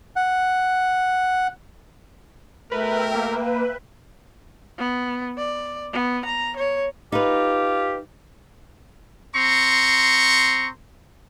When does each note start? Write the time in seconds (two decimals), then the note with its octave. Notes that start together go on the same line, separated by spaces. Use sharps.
0.16 F#5
2.72 B2 A3 A#4 B4 E5 G5
3.15 A#3 B4
4.78 B3
5.37 D5
5.93 B3
6.25 A#5
6.57 C#5
7.12 D#4 F4 G4 B4
9.36 C4 A#5 C6 C#6